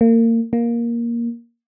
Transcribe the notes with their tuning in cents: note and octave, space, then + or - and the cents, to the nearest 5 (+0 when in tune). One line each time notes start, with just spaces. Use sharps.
A#3 -30
A#3 +10